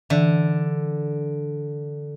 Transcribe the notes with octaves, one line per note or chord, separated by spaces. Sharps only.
D3 E3